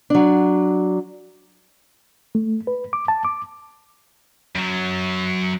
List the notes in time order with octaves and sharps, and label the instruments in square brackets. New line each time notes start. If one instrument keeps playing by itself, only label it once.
[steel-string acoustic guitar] F#3 D4
[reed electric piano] A3
B4
D6
A5
D6
[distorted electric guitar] F#2 F#3